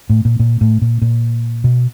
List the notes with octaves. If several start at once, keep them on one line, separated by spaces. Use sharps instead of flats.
A2
A#2
A#2
A2
A#2
A#2
B2